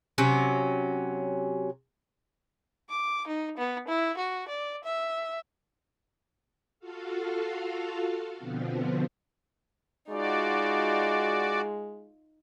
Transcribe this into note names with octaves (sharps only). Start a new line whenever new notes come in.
C3 F#3 C#4
D6
D#4
B3
E4
F#4
D5
E5
F4 F#4 A4 F5
B2 D3 F3 B3 C4
G#3 D#4 F4 F#4 D5